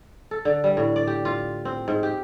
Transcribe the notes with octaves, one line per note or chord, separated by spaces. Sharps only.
A4
D3
G3
A2
D5
G4
F4
C4
G#2
G4